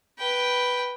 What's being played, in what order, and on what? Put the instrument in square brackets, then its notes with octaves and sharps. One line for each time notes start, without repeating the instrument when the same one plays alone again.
[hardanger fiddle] B4 G5